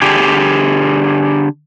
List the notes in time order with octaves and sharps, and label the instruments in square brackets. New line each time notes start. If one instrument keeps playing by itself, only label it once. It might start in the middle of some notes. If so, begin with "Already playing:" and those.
[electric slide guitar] D3 G4 G#4